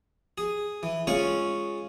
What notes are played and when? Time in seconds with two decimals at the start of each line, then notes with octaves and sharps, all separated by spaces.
0.38 G#4
0.83 E3
1.07 G#3 C#4 F4 C#5